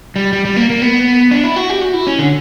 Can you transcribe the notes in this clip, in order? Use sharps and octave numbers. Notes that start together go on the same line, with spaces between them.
G3
G3
G3
A#3
A#3
B3
D4
E4
F#4
G4
F#4
E4
C#4
D3